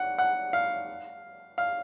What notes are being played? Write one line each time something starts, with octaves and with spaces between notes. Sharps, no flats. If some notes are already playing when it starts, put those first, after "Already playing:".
Already playing: F#5
F#5
F5
F5